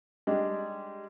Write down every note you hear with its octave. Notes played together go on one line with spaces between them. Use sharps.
G3 G#3 D4 D#4